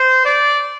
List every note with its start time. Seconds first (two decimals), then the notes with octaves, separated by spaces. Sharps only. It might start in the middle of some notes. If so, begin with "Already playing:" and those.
Already playing: C5
0.26 D5